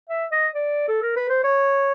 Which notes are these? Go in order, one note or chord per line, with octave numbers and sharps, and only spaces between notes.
E5
D#5
D5
A4
A#4
B4
C5
C#5